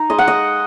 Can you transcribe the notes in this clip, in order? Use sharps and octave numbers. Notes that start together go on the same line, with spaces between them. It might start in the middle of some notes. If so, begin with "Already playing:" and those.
Already playing: D#4 A#5
G#3 D#5
F#5
D#5